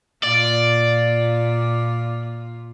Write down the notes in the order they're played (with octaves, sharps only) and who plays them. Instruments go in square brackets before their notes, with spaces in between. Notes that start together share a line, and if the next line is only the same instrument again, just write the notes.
[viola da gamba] A#2 F4 [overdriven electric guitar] D5